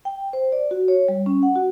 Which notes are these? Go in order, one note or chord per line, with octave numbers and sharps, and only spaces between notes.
G5
C5
D5
F#4
C#5
G3
C#4
F#5
F#4